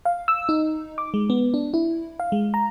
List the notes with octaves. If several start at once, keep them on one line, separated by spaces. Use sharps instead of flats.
F5
E6
D#4
D6
G#3
B3
D4
E4
F5
G#3
A#5